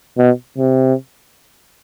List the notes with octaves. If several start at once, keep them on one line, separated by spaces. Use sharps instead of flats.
B2
C3